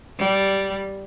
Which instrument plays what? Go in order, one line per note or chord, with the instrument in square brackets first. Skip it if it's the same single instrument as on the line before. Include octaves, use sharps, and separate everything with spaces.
[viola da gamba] G3